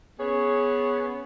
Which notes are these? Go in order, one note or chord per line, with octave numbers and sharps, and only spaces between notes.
B3 C#4 G#4 C#5